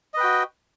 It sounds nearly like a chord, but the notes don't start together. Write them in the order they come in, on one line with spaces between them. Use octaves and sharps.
D#5 B4 G5 F#4